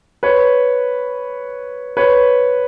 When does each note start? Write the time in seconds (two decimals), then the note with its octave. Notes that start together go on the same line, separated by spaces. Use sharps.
0.23 B4 C#5
1.97 B4 C#5